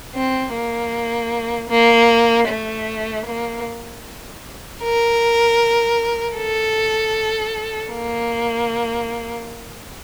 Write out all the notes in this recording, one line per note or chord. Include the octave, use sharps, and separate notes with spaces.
C4
A#3
A#3
A3
A#3
A#4
A4
A#3